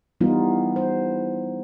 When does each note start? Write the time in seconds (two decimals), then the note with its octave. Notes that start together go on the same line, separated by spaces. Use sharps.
0.21 E3 G3 B3 D#4 F4
0.76 C5